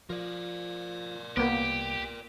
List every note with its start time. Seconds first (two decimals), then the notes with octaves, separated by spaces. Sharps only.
0.10 F3 A#4 D5
1.37 C2 A#3 B3 G4